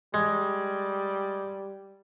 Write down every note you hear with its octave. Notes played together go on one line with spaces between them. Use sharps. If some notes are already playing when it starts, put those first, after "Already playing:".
G3 G#3